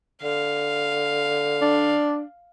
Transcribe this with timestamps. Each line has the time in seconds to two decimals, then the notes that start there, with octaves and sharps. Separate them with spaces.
0.23 D3 F5
1.62 D4